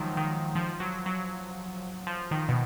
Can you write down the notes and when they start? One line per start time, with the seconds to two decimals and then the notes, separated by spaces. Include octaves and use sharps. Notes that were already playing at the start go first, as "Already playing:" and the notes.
Already playing: D#3 F3 F#3 G#3
0.17 D#3
0.55 F3
0.80 F#3
1.06 F#3
2.07 F3
2.31 D#3
2.49 B2